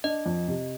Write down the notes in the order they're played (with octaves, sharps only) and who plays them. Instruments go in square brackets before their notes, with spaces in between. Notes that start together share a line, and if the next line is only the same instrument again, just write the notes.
[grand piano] D4 [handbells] D#5
[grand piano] F2
C3